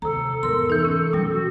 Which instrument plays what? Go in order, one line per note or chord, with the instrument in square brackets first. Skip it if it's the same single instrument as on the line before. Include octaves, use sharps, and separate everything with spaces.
[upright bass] D#2 [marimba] C3 A#5 [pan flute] A4
[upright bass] E2 G#2 [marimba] A#4 C6
[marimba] E3 D#4
[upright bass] C4 [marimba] C#4
[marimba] B2 G3 [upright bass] F#3 A3
[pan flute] F#4